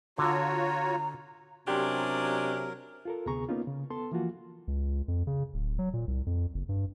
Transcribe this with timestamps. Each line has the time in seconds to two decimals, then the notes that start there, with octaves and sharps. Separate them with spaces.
0.18 D3 F4 F#4 C#5 A#5
1.68 C3 F#3 C#4 D4 G4 A#4 C6
3.05 F4 A4 A#4
3.26 D2 C3 B3 G#4 A#5 C#6
3.49 A#3 B3 C#4 D#4 F4
3.67 C#3
3.90 B3 A4 A5 C6
4.12 E3 F3 A#3 F4 F#4
4.68 C#2
5.08 F2
5.27 C#3
5.54 D1
5.79 F#3
5.93 A#2
6.07 C2
6.26 F2
6.54 F#1
6.69 G2